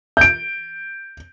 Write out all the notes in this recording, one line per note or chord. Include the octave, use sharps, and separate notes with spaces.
G6 D7